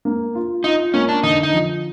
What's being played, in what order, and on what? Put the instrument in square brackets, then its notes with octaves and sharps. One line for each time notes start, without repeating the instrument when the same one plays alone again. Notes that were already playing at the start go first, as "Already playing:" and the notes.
[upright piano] A#3
F4
[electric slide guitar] D#4 [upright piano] F4
[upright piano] A#3 [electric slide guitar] C#4
[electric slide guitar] D4
[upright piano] D3 [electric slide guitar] D#4
[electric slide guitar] D#4
[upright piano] F3